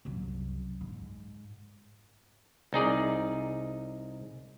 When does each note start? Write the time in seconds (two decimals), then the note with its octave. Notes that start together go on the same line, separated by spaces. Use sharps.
0.05 C2 F#2
0.81 G#2
2.73 C2 D#4 G#4 D5